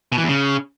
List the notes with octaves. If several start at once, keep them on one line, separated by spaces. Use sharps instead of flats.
B2
E3
E2
C#3